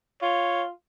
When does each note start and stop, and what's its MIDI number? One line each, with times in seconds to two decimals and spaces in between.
0.22 0.68 65
0.22 0.64 73